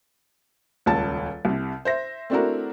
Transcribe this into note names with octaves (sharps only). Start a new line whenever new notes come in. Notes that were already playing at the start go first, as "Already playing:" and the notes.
D#1 C#2 A5 A6
C2 C3
C5 E5 A#6
A3 C4 D4 E4 F#4 A#4